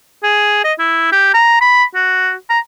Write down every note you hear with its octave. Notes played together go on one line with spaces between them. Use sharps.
G#4
D#5
E4
G4
A#5
B5
F#4
A#5